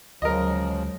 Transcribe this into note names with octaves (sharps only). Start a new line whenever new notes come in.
D2 C#3 F3 F#3 G#3 C#4 A#4 D#5